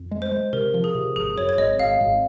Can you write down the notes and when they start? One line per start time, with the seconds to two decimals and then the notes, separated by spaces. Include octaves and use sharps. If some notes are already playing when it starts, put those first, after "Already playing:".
Already playing: F2
0.11 G#3
0.22 C5
0.32 G#3
0.53 C3 A#4
0.74 F3
0.84 G#4
0.95 C3
1.16 G#1 G#4
1.36 F#2 C#5
1.49 C#5
1.58 G#1 D#5
1.79 G#1 F5
2.01 G#1